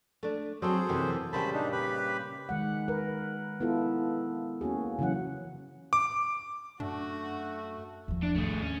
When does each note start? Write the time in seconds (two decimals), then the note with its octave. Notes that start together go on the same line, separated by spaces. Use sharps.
0.23 A3 D4
0.62 F#3 C4 G#4 A4 C5
0.89 F#2 C3 E3
1.33 A#2 C#3 G3 C5 A5 B5
1.53 D4 D#4
1.72 G4 B4 B5
2.49 D#3 G#3 F#5
2.88 A#4 B4
3.60 B3 E4 F4 A4
4.61 A#3 C#4 F#4 G#4
4.99 C#3 E3 F#3 C#4 F#5
5.93 D6
6.80 F#2 A3 D4 F#4
8.08 E2 F3
8.23 D4
8.35 D#2 G#2 A3 G#4
8.62 C#4